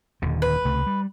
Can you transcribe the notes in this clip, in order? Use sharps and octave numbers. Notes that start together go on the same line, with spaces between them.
D#1 D#2 D3
B4
C#2 C3 A3
G3